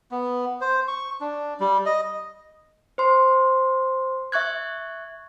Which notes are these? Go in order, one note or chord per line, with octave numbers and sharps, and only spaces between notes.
B3
C5
C#6
D4
G3
D#5
C5 C6
E5 C#6 F#6 G#6